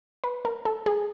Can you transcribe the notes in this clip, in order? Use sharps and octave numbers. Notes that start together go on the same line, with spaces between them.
B4
A#4
A4
G#4